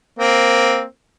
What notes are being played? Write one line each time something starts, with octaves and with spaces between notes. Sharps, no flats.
A#3 C4